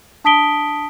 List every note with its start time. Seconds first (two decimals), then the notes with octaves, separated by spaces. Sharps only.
0.24 D4 A5 D#6 B6 D7 G7